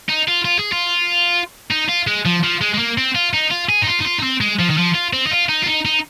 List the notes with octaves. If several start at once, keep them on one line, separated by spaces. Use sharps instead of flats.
D#4
F4
F4
G#4
F4
D#4
F4
G#3
F3
F3
G#3
G#3
A#3
C4
F4
D#4
F4
G#4
D#4
F4
D#4
F4
D#4
C4
G#3
F3
D#3
F3
F4
C4
D#4
F4
D#4
F4
D#4
D#4